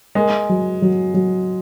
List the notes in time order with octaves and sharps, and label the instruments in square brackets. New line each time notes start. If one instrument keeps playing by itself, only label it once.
[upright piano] G#3 [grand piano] A#4
[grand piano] F#3
F#3
F#3